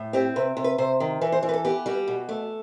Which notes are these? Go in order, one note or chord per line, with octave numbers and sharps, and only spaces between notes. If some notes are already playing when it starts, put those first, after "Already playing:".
Already playing: A2
C4 G4
C3 B4
C3
B4
C3 C5
D#3
E3 B4
C5
E3
B4
A4
B3 G4
G3 F#4
B2
A3